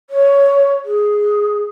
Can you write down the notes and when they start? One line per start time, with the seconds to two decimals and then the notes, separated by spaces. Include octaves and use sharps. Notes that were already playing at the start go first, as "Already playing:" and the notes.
0.10 C#5
0.85 G#4